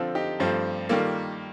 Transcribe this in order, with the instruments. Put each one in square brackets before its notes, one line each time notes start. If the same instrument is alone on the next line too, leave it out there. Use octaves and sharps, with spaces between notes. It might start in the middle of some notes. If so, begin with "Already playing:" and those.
Already playing: [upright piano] D3 F3 C4 F4 A4
D#4 G4
G2 F3 A3 C4
D#3 G3 A#3 F4 A4